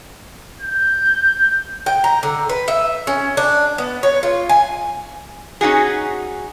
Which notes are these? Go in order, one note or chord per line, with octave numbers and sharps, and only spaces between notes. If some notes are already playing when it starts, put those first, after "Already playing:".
G6
G5
A#5
D3
B4
E5
C#4
D4
B3
C#5
F4
G#5
C#4 D#4 F#4 G#4